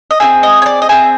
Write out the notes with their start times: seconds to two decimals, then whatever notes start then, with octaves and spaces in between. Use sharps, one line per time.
0.11 D#5
0.20 C4 D#4 G#4 E5
0.43 D#5
0.62 C#5
0.66 D5
0.82 D#5
0.89 C4 D#4 G#4 E5